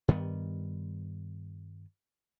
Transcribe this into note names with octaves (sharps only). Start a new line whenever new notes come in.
G2 D#3 G3 B3